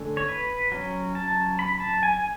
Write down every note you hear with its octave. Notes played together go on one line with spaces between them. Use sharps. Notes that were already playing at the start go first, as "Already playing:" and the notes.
Already playing: D3 A3 C#4
C#5
B4
F#3 C#4
A5
B5
A5
G#5